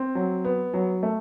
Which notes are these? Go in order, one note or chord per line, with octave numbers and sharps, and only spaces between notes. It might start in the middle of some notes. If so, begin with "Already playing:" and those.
Already playing: C4
F#3
B3
F#3
A3